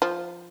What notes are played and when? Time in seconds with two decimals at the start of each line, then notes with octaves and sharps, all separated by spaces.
0.02 F3